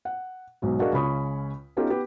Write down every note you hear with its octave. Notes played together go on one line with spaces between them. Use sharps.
F#5
B1 G#2 F#3
D4 F#4 G#4 A#4 D#5 F5
C#2 C#3 C#4 B5 C#6 D#6
B3 C#4 D#4 F4 G4 A4
B3 G4 B4